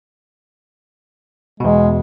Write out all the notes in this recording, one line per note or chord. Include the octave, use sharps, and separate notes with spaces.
E2 B2 G#3